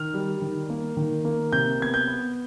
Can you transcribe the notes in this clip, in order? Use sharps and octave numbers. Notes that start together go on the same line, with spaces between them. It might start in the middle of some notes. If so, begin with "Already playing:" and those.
Already playing: D#3 F6
G3
D#3
A#3
D#3
A#3
C3 G6
B3 G#6
G6
B3